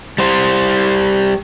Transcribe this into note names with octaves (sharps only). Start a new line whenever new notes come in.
G3 C5